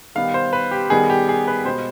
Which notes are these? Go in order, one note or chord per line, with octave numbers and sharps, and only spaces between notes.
D#3 G3 B3 F5
C5
B4
G4
D#3 G3 B3 G#4
G4
G#4
B4
B2 G#3 B3 C5